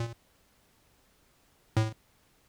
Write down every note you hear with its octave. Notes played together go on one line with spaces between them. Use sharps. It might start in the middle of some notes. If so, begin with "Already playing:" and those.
Already playing: A#2
A2